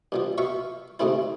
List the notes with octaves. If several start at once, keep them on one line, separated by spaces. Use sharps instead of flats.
G2 B2 F3
B2 E5 F5 C#6
D2 G#2 C3 A3 C4 E4